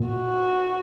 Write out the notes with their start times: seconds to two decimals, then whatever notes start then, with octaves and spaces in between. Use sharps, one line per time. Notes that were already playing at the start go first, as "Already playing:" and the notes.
Already playing: A#2
0.09 F#4